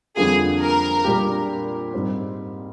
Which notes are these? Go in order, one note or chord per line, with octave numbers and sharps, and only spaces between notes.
F2 D3 G3 A#3 F4 G#4
A#4
A#2 G3 A#3 D4 G4
G#2 G3 C4